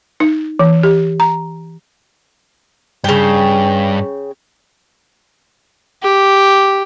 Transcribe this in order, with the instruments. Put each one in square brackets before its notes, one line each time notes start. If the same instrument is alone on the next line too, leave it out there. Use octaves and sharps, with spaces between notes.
[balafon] D#4
E3
G4
A#5
[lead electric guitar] G2 [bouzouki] C#3 G5
[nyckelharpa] G4